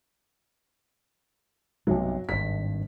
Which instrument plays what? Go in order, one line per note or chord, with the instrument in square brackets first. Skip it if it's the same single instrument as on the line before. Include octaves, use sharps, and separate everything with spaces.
[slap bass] B1 G2 C3 [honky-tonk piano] F#3
[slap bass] G#1 G2 [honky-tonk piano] B6